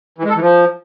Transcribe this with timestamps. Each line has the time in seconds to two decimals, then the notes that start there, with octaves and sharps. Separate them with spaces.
0.18 E3
0.24 G#3
0.30 A4
0.35 E3
0.41 F3